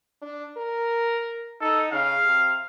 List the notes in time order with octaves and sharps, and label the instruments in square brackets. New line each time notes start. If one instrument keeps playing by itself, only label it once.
[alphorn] D4
A#4
[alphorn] D#4 [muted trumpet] A4
[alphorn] C#3 [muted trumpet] F5
[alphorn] C3